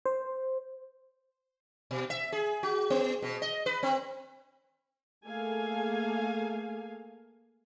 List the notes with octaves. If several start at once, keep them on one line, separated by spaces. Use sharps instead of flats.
C5
B2
E5
G#4
F#4
B3
B2
D#5
B4
C4
A3 A#3 G#4 A4 F5 G#5